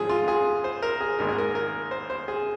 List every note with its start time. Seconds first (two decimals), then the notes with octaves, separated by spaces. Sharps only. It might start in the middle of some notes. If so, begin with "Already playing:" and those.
Already playing: G#2 F3 G#3 G#4
0.09 F4
0.28 G#4
0.64 C5
0.82 A#4
1.01 G#4
1.19 G#1 G#2 D#3 A#3 A#4
1.28 G#4
1.38 A#4
1.55 A#4
1.91 C5
2.10 C5
2.28 G#4